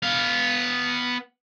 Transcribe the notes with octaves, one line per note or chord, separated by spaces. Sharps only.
B3 F5